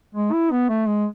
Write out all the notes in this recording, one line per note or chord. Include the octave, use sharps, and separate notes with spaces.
G#3
E4
B3
A3
G#3